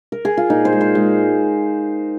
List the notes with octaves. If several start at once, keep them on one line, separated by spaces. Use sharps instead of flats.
A#4
G#4
F4
A#2 D#4
C5
G#3
C5
G#3